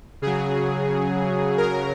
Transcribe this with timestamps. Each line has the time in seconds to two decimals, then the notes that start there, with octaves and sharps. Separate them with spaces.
0.22 C#3 F#3 G#4
1.57 A#4